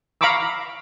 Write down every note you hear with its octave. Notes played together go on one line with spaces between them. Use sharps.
F5 A#5 B5 C#6 D6 E6